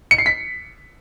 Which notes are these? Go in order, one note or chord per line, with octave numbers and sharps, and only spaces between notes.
C#7
C7
B6